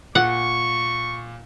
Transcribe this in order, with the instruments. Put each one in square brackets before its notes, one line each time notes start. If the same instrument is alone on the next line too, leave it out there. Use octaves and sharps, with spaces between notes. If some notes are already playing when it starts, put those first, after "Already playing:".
[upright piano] A#2 [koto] F#5 [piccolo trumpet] C#6